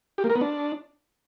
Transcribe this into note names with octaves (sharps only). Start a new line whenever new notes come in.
G4
A#3
A#4
B3
D4